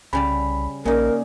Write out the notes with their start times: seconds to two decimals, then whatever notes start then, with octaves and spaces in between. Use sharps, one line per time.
0.13 C2 C#3 G3 D5 B5
0.85 A#1 C#3 A#3 D#4 A#4 D5